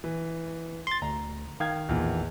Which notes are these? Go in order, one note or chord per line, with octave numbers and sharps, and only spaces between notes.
E3
C6 A6
D2 A#5
D#3 F5 G5 G#6
A1 E2 A#2